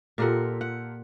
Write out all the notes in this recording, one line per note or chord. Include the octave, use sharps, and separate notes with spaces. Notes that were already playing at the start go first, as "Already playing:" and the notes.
A#2 F4 G4 A4 A#4 F#5
F#5